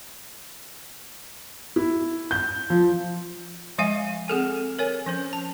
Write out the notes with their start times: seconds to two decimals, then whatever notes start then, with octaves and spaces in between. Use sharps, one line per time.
1.76 E4
2.31 G6
2.70 F3
3.78 F3 G#3 D#5 F5 G#5
4.28 C4 G#4 A4 G#5
4.79 A#4 C#5 G#5
5.06 F3 C#4 C5
5.33 A5